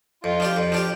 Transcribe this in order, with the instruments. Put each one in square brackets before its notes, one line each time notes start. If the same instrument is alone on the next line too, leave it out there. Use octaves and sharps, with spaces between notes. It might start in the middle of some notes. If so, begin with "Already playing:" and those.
[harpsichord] F2 [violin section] F4
[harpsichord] F3 D4 G4
F2
F3 D4 G4